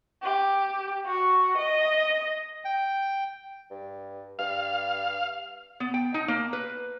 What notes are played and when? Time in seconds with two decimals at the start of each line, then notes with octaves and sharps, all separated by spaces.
0.22 G4
1.06 F#4
1.57 D#5
2.65 G5
3.70 G2
4.39 G2 F5
5.80 B3
5.94 G5
6.14 D#4
6.28 A#3
6.53 B4